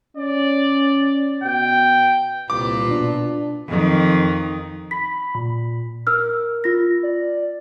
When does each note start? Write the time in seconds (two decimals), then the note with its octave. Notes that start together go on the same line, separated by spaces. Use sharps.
0.17 C#4 D5
1.44 B2 G5
2.50 C2 A#2 F4 B4 D6
2.88 B2 D4
3.68 F2 D#3
4.91 B5 B6
5.35 A#2
6.07 A#4 E6 F6
6.64 F4 A#6
7.03 D5